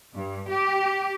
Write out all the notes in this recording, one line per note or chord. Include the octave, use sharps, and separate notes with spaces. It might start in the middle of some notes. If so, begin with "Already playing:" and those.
G2
G4